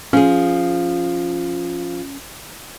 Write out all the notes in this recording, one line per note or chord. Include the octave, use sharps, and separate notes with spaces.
F3 C#4 G#4